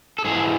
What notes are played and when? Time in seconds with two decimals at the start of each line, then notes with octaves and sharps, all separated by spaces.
0.19 A4
0.25 G#2 E3 G#4